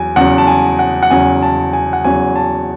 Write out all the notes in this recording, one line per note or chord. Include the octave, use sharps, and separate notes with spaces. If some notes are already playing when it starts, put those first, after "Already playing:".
Already playing: E2 F#3 G#5
E2 C#3 F#3 F#5
A5
G#5
F#5
F#5
E2 C#3 F#3 G#5
A5
G#5
F#5
E2 C#3 F#3 G#5
A5